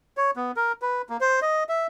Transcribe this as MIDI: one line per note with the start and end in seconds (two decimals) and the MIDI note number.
0.17 0.31 73
0.36 0.52 59
0.56 0.72 70
0.82 1.02 71
1.09 1.17 58
1.21 1.40 72
1.42 1.64 75
1.69 1.87 76